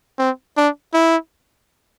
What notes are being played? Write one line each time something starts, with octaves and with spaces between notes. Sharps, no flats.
C4
D4
E4